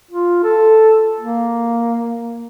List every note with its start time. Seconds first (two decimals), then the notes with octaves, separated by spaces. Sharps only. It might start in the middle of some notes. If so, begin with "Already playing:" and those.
0.11 F4
0.44 A4
1.21 A#3